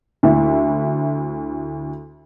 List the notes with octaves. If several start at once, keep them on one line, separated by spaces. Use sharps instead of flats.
D2 E4 E5